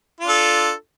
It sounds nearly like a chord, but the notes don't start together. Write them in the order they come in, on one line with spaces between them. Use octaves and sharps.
F4 D4 A4